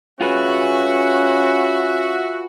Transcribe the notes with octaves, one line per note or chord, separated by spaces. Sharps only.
C#4 F4 F#4 G#4 B4 E5